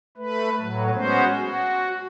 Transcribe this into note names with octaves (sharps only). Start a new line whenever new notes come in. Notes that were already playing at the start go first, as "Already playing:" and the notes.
A3 B4
A2 F#3
G#3 B3 C#4 F#4 C5
F#4